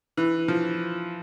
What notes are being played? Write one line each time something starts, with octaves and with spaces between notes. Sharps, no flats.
E3
F3